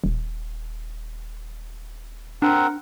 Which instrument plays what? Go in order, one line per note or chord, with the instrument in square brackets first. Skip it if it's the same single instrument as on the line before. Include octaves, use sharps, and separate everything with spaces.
[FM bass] D#1
[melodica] C4 A#4 F#5 [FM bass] D4